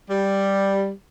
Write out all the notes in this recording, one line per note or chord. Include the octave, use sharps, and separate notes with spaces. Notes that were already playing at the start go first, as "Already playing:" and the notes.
G3